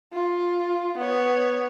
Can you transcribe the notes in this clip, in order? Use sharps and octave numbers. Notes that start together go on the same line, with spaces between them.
F4
B3 C#5